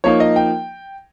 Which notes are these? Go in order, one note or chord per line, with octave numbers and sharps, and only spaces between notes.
F3 A#3 D#4 C#5
D#5
G5